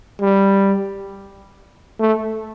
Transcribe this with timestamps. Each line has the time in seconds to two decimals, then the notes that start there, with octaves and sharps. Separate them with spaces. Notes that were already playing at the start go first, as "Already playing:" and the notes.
0.21 G3
2.00 A3